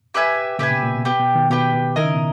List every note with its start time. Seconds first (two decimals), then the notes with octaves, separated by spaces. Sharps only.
0.14 G4 B4 E5 G#5
0.59 A#2 C#3 G4 B4 E5 G#5
0.71 B2
0.82 A#2
0.94 B2
1.05 B2 G4 B4 G5
1.20 B2
1.35 B2 D#3
1.50 B2 G4 B4 G5
1.74 B2
1.96 D#3 E4 A#4 D#5
2.05 C#3
2.14 B2